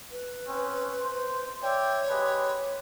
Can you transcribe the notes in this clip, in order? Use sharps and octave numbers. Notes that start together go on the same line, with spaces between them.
B4
C4 C#4
C5
C#5 D5 E5 G5
G#3 G4 B4